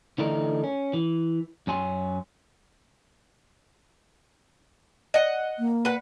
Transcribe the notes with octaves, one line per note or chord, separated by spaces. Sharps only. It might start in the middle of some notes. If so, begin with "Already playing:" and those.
D3 E3 A3 D4 D#4 A#4
C#4
E3
F#2 C#4 G#5 C6
D#5 F#5
A#3
B4 F#5